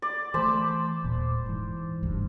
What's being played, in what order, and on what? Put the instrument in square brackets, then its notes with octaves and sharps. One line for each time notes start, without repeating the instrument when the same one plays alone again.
[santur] D5
[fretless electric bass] E3 A3 [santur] C5 A5 B5
[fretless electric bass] D#1 A#2
G#2 E3
F#1 D2 G2